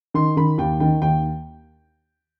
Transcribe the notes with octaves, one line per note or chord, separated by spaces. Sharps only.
D#3 C6
D#3 B5
D#2 G5
D#3 G5
D#2 G5